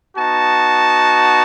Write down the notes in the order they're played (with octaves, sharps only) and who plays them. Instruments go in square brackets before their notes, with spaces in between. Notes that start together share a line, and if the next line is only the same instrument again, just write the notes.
[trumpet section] B3 D#4 F#4 A5